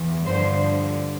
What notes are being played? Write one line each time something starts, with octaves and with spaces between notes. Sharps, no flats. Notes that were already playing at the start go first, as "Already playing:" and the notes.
Already playing: E2 E3
G2 D3 F3 C5